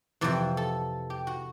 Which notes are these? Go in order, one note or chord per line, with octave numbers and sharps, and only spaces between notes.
F2 C3 E3 D5
A4
G4
F#4